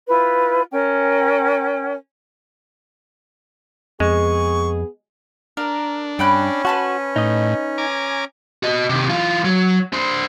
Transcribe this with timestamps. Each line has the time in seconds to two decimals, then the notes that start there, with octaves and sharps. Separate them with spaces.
0.08 E4 F4 B4
0.71 C#4 A#4 G5
4.00 F2 G#3 B3 G#4 C#6
5.57 D4 A#4
6.19 G2 C#4 G5 B5 F#6
6.65 F#4 B4 A5 C6
7.16 A2 D#4 D#5
7.78 G#5 A#5 D6
8.63 F#4 D#5
8.89 C3 D#3
9.10 E3 F4
9.45 F#3
9.93 D4 C5